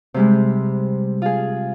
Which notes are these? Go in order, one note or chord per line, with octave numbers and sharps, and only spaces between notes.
C3 G3 G#3
F4 G#4